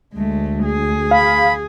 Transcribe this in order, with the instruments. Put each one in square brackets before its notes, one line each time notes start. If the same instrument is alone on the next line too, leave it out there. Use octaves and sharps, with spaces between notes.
[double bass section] D2 [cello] G#3 A3
[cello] G#4
[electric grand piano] F5 [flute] B5